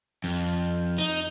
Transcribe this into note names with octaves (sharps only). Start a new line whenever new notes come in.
F2
D#4